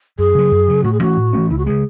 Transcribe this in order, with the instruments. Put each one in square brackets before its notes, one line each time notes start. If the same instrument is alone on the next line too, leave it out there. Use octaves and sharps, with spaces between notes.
[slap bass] F#2 [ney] G#4
[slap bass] C#3 F#3
F#2
C#3 F#3
[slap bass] A2 [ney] F#4
[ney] G#4
[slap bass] E3 A3 C#4 [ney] F#4
[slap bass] A2
E3 A3 C#4
[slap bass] C#2 [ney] E4
[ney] F#4
[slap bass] C#3 G#3 [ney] G#4